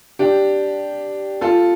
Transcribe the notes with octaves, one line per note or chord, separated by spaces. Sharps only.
D4 G4
F4 A4